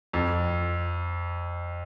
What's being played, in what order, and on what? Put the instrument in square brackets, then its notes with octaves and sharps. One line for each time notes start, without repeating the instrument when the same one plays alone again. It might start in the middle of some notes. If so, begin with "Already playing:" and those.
[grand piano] F2